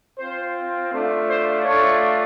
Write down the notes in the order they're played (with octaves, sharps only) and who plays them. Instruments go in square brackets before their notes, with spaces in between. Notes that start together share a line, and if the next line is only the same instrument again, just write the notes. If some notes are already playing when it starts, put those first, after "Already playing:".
[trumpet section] C4 F4 C5
A3 D4 F4 C5
C5
A3 D4 F4 C#5